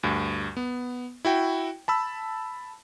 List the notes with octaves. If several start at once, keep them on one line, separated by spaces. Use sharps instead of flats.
D2 G2
B3
E4 F#4 G5
A5 B5 E6